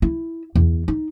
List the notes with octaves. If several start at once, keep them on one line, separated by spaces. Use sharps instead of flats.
E4
E2
D#4